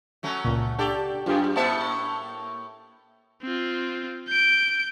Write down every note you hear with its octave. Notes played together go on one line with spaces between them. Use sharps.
F#3 A3 C#4
C#2 A#2
D4 G4 A4 D5
F#2 F4 G4 G#4
A2 A#3 E5 A5
C4 F4
G6 D7